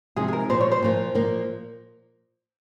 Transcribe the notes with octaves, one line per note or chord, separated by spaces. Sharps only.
C3 F3 G#3 D#4 G#4
G#4
A#4
A#2 F3 A#3 C5
C#5
C5
A#2 F3 A#3
A#2 F3 A#3